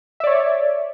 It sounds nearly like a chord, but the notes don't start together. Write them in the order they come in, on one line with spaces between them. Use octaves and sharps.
E5 D5 C#5